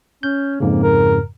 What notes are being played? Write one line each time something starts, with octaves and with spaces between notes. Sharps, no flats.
C#4 G6
F2 G#2 C#3 A#3
A#4